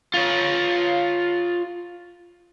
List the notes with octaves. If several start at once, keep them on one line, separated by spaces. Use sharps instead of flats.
F4 C#5